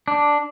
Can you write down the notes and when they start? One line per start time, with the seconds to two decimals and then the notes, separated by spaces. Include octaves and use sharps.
0.08 D4